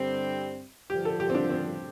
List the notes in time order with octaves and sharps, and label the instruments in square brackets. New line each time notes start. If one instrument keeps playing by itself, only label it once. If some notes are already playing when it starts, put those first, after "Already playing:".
Already playing: [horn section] G2 D3 G3 C4
[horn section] G2 D3 F3 [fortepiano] G4
[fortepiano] A4
G4
C4
D4
C4